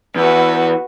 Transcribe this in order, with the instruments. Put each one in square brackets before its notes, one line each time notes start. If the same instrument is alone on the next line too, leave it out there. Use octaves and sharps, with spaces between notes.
[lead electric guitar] E2 [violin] F#4 B4